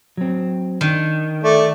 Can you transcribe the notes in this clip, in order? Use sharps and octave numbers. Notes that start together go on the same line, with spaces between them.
F#3 C4
D#3 D4
A3 D5